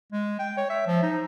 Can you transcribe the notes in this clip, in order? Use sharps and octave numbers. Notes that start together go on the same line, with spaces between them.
G#3
G5
C#5
E5
F3
D#4